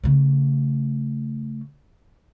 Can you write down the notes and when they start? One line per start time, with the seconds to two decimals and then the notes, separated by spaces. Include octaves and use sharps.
0.04 C#3 A3